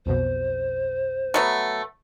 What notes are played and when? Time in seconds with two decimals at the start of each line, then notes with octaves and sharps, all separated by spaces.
0.06 B1 F2 B2 C5
1.34 F#3 A3 B3